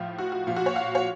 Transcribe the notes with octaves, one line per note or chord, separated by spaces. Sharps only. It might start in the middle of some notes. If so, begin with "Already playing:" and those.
Already playing: A2 F3 F4
F#4
F#4
A#2 F3 F4
F#4
C#5
F5
C#5